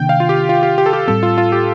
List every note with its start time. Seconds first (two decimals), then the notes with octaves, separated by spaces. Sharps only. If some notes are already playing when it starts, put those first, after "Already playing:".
Already playing: C3 D#3 A#3 D4 G5
0.09 F5
0.20 F4
0.29 G4
0.49 F4
0.63 G4
0.78 G4
0.86 A4
0.93 G4
1.07 A2 G3 C4 A4
1.23 F4
1.38 F4
1.52 G4